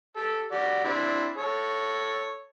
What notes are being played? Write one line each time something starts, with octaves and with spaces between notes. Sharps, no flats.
G4 A4
F#4 G4 D5
C4 D4 E4
A4 C#5